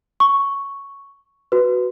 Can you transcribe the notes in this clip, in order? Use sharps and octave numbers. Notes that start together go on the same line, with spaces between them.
C#6
F#4 B4